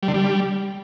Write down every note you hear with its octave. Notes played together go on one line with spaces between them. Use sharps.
G3
D3
G3